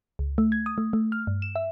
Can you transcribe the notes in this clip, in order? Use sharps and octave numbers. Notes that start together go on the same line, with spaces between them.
C#2
A3
G#6
D#6
A3
A3
F6
G2
E7
E5